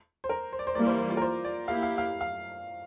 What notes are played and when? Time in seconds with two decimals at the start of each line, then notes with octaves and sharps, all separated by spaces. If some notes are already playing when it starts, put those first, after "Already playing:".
0.24 C5
0.29 A#4
0.53 C5
0.59 D5
0.67 C5
0.75 E3 G3 A#3 D5
0.86 C5
0.98 C5
1.10 F4
1.17 A#4
1.22 C5
1.45 D5
1.67 A#3 E4 G4 F5
1.83 F5
1.98 F5
2.21 F5